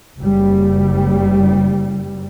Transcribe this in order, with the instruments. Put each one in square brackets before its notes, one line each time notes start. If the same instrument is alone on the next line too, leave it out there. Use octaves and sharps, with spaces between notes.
[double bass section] F#1 G3